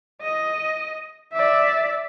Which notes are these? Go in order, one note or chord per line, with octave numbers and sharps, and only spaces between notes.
D#5
D5 E5